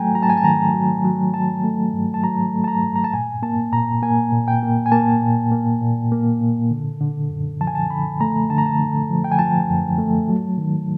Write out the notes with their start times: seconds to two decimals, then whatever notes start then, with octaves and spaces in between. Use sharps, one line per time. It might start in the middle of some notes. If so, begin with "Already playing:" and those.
Already playing: F#3 A3 G5 G#5 A#5
0.15 F#3 A#5
0.23 A5
0.30 G#5
0.37 A5
0.44 D#3 A#5
0.74 F#3
1.05 F#3
1.34 F#3 A5
1.64 A3
1.93 G2
2.14 A5
2.23 F#3 A#5
2.54 A3
2.64 A5
2.68 A#5
2.83 G2
2.96 A#5
3.04 A5
3.13 A#2 G#5
3.43 A#3 A5
3.73 A#2 A#5
4.03 A#3 G#5
4.33 A#2
4.48 G5
4.63 A#3
4.86 G#5
4.92 A#3 A5
5.21 A#2
5.52 A#3
5.81 A#2
6.12 A#3
6.40 A#2
6.71 D3
7.01 D3
7.30 F#2
7.61 F3 A5
7.67 G#5
7.75 A5
7.90 D3 B5
8.21 A3 A#5
8.50 D3 A5
8.58 A#5
8.66 A5
8.80 D3
9.10 F3
9.24 G5
9.32 G#5
9.39 F3 A5
9.69 F#2
9.98 A3
10.29 F#3
10.58 D#3